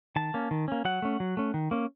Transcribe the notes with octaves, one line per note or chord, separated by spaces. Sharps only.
D#3 A5
A#3 C#4
D#3
A#3 C#4
F#3 F#5
A3 C#4
F#3
A3 C#4
D#3
A#3 C#4